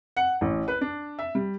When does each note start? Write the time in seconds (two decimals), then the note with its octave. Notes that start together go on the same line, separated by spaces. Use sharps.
0.17 F#5
0.41 A1
0.68 B4
0.81 D4
1.19 E5
1.35 G3